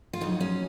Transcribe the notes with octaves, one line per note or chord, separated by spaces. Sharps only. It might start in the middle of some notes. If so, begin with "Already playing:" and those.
F4
F2 D#3 F#3 D#4
C#4